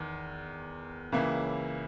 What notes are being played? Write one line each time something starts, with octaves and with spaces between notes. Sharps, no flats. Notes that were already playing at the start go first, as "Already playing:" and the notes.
Already playing: E2 D#3
C#2 C#3 E3 A#3 E4